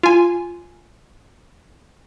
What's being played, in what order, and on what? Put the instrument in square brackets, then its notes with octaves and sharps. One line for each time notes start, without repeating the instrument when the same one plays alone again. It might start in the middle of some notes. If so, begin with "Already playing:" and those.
[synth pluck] F4 G#5